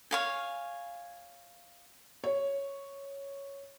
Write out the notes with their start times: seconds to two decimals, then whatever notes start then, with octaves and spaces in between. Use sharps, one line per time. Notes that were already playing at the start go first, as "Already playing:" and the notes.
0.11 C#5 F5 G#5
2.24 C#5